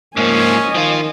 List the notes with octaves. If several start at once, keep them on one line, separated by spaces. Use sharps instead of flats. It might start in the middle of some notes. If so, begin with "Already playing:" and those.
G#2 F3 A#3 C#4 D#5 G#5
D#3 F3 F4